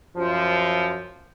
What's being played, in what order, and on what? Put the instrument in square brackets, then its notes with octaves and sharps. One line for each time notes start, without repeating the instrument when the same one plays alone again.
[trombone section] F#2 F3